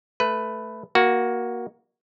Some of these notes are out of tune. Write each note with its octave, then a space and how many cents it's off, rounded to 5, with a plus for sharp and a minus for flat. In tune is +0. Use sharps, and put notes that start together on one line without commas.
A3 +0 B4 +5
A#3 +15 F#4 +0